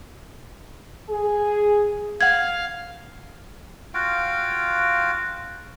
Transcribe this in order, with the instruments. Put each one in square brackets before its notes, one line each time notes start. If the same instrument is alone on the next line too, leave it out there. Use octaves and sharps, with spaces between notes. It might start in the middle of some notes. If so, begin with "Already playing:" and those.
[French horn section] G#4
[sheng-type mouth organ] F5 [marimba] F#5 G#6
[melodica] F4 F#4 F5 G5